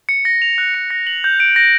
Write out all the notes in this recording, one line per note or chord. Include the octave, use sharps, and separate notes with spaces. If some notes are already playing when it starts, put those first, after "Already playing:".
C#7
A#6
F7
F#6
C#7
A#6
F#7
G6
D7
A#6